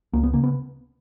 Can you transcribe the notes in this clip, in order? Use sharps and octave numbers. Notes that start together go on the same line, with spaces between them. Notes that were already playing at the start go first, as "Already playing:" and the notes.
C#2 A#3
B3
C#3 A#3
B3